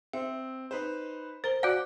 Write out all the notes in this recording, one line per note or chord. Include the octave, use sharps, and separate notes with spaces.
C4 E5
D#4 B4 C5
A#4 C5 G7
F#4 D5 F#5 F#6 G6